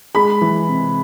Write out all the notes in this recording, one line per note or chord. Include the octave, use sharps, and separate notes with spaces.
G#3 B5
E3
C3